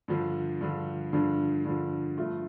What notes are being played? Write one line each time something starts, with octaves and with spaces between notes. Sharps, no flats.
G2 D3 F3
G2 D3 F3
G2 D3 F3
G2 D3 F3
G2 F3 A3 F4